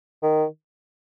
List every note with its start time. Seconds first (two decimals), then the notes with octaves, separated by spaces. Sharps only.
0.23 D#3